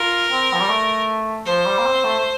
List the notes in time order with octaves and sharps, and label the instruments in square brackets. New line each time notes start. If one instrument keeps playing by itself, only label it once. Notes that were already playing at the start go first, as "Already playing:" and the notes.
Already playing: [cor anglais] F4 [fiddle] A#4
[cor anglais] C4
F3
G3
A3
[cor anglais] F3 [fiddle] C5
[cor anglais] G3
A#3
C4
A3
A3